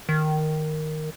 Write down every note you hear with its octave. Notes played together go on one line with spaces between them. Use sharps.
D#3